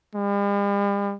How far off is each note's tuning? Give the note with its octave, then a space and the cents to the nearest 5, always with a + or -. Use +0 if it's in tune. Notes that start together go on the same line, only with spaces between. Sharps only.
G3 +45